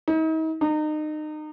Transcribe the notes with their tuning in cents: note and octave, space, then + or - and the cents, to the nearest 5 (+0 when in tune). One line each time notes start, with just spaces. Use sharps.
D#4 +40
D#4 -30